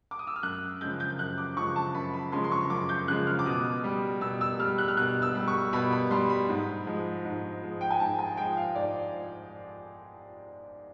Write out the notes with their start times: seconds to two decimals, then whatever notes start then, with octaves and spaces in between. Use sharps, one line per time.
0.11 D6
0.19 D#6
0.27 E6
0.36 F6
0.43 F#2 F#6
0.81 C#3 F3 G#3 G6
1.00 G6
1.19 F#2 F#6
1.38 D6
1.57 C#3 F3 G#3 C#6
1.76 A5
1.94 F#2 B5
2.14 B5
2.32 C#3 F3 G#3 C6
2.44 C6
2.51 C#6
2.70 F#2 D6
2.89 G6
3.08 C#3 F3 G#3 F#6
3.27 F6
3.39 D6
3.46 B2 D#6
3.84 G3
4.21 B2 E6
4.41 E6
4.59 G3 F6
4.78 F#6
4.88 F6
4.97 B2 F#6
5.22 E6
5.35 G3
5.48 C#6
5.73 B2 B5
5.92 B5
6.11 G3 C6
6.30 B5
6.49 G#2
6.86 F3 G#3
7.25 G#2
7.62 F3 G#3
7.81 G5
7.91 G#5
8.00 G#2 A5
8.19 G#5
8.37 F3 G#3 G5
8.57 F5
8.75 G#2 D5